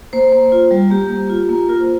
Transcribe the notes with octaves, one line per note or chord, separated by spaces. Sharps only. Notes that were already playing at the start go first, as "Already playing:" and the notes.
A#3 C5
A#3
F4
G3
A#3 G4
A#3
F4
A#3
F4 A#4
C5